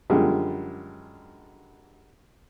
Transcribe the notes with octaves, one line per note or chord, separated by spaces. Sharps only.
F#2 D3 F3 G3 G#3